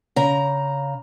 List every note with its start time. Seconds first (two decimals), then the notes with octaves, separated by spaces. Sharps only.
0.16 C#3 A#5